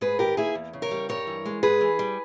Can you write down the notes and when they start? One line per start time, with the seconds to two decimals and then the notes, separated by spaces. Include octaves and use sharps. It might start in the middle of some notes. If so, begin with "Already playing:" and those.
0.01 G#2 G#4 B4
0.19 D#3 G4 A#4
0.37 A#3 E4 G#4
0.55 E2
0.73 C#3
0.82 A#4 C#5
0.91 G3
1.09 G2 A#4 C#5
1.27 E3
1.45 G#3
1.63 G#2 G#4 B4
1.81 E3
1.99 G3